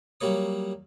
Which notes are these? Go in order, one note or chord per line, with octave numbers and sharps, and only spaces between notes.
F#3 G3 A#3 C#5 D#6